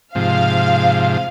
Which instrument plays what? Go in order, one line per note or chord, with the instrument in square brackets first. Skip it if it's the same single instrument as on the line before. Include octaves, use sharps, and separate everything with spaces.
[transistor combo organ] G#2 C3 F3 [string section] F5